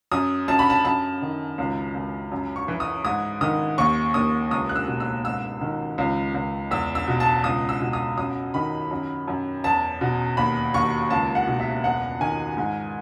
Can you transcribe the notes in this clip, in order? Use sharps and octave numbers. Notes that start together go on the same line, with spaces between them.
F#2 D#6
F#2 A5
B5
A5
F#2 A5
D#3
C#2
C#2
F#2
C#6
E3
D#6
G#2 D#6
D#3 D#6
D#2 C#6
D#2 D#6
C#2 D#6
F#6
E6
B2
E6
G#2 E6
D#3
C#2
C#2
E2 E6
E6
B2
A5
C#2 D#6
E6
B2
D#6
F#2 D#6
D#3 B5
F#2
F#2
E2 A5
B2
D#2 B5
D#2 C#6
C#2 A5
F#5
B2
E5
E2 F#5
D#3 G#5
G#2